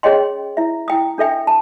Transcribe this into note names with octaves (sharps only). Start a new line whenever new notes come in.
C#4 G#4 C#5 D#5 G5 C6
E4 E5
E4 G5 D#6
D4 A4 E5 G5
A5